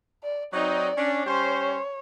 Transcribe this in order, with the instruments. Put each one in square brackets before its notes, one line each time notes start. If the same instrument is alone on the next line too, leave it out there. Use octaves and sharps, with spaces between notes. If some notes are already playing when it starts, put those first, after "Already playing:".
[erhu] D5
[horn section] F#3 C4 D#4 [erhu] D5
[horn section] C#4 D4
[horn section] G3 C#4 C5 [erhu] C#5